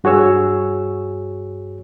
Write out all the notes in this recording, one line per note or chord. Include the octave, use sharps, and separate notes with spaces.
G2 F#4 G#4 C#5 E6